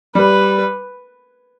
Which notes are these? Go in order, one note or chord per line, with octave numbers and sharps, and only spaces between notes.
G3 B4